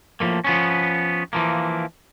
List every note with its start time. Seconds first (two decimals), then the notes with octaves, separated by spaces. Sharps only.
0.20 A2 F3 A3 A#3
0.44 F3 B3 C#4
1.33 E3 F3 A#3